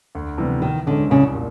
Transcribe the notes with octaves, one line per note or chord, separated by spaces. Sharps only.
D2
C3 E3 G3 B3
D#3 E3
D3 G#3 C#4
C2 C#3
A#2